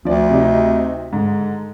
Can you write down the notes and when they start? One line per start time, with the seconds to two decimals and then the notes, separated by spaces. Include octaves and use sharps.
0.05 D2 F3 D5
0.30 C3 D#4
1.13 G#2 D3